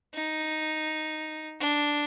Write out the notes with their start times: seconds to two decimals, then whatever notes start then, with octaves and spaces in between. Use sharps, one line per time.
0.14 D#4
1.59 D4